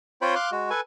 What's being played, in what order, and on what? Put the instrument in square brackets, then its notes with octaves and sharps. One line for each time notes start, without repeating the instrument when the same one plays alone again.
[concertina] C4 F4 C5 C#5 G5 B5
F5 C6 D6 F#6
G#3 F#4
A4 B4 G#5